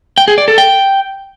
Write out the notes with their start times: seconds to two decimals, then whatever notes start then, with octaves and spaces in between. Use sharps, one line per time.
0.18 G5
0.28 G#4
0.38 D5
0.48 A4
0.58 G5